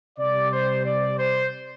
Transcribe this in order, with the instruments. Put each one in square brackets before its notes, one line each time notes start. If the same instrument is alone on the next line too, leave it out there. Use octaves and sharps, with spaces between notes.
[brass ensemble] C3 G3 D5
C5
D5
C5